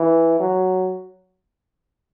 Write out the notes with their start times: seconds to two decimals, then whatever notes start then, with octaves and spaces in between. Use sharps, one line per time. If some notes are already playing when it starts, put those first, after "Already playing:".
Already playing: E3
0.40 F#3